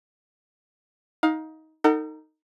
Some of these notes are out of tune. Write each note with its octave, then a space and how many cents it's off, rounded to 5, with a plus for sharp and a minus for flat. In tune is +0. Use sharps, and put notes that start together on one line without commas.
D#4 +20 F5 +25
D#4 +0 A4 +45 F#5 +20